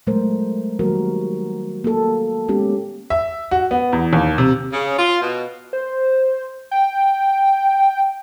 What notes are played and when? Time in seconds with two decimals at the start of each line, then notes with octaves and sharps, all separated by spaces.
0.07 A#2 F#3 G#3 A3 A#4 C5
0.79 D#3 F#3 G3 A#3 F#4 A#4
1.84 A#3 A4
2.48 G#3 B3 C#4 G4
3.10 E5
3.51 F#4
3.71 B3
3.93 E2
4.13 D#2
4.38 C3
4.73 C#3
4.99 F4
5.22 B2
5.73 C5
6.71 G5